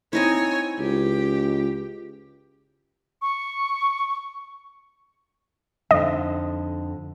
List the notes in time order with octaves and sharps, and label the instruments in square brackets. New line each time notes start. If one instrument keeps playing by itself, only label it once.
[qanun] C4 D#4 E4 [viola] C#5 G#5
[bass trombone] C#2 [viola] G4
[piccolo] C#6
[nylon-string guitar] F2 D3 D#4 [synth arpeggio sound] D#5